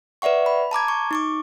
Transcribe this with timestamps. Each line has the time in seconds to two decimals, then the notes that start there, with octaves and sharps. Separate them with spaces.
0.22 B4 D5 E5 F#5 C#6
0.46 B5
0.71 A5 A#5 D6 G#6
0.88 C#6
1.11 D#4 C#6 D6